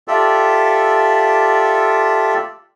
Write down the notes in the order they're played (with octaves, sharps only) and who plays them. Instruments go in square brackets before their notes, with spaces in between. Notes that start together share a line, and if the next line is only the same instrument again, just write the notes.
[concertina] F4 G4 A4 D5 E5